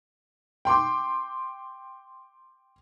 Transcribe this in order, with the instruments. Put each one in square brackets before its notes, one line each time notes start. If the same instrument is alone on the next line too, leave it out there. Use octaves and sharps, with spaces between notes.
[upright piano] G5 C6 D6